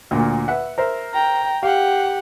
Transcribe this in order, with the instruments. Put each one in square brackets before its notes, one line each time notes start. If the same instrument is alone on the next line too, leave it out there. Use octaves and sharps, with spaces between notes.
[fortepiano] D2 A#2 A#3
B4 E5 F#5
A#4 C5 E5
[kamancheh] G5 A#5
[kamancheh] G4 F#5 [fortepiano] F5